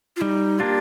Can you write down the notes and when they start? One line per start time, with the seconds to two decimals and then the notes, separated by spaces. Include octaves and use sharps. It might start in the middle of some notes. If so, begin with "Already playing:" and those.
0.16 F4
0.21 G3 D#4
0.59 A#3 D4 F4 G4